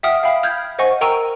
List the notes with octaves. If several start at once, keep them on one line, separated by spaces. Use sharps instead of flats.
E5 F#5 G5 D#6 F6
E5 F5 G5 B5
F6 G6 G#6
C5 D#5 F#5 G#5 C#6
A#4 G5 A#5 C#6 E6 D#7